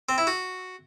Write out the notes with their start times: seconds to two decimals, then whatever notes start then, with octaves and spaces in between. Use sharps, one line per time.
0.09 C4
0.18 E4
0.27 F#4